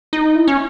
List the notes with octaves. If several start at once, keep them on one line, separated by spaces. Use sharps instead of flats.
D#4
E4
C#4